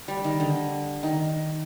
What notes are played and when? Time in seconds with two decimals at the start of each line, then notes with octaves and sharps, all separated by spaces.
0.08 G3
0.24 D#3
0.40 D3
1.03 D#3